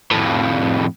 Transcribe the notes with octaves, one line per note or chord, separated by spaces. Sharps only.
F2 A2